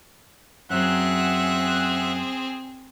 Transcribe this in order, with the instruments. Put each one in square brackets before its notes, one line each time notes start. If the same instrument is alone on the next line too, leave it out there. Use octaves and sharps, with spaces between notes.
[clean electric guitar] F#2 F#3 [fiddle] C4 G#4 [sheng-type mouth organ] E5 F#5 F#6